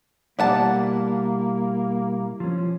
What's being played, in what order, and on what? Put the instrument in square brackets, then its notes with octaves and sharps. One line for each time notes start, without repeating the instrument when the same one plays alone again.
[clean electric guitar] B2 G3 E4 [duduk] A#3 [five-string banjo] D5 F#5 A5
[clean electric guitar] F3 C#4